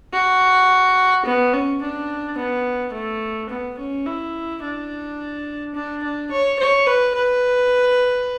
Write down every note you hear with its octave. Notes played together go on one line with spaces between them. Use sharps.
F#4
B3
C#4
D4
B3
A3
B3
C#4
E4
D4
D4
D4
C#5
C#5
B4
B4